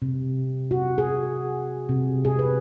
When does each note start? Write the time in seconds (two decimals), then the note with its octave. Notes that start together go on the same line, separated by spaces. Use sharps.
0.02 C3
0.71 F#4
0.98 G#4
1.89 C3
2.25 G#4
2.39 B4